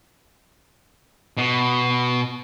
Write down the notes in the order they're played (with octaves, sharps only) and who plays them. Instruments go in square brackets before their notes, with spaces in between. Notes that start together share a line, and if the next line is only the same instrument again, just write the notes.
[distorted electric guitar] B2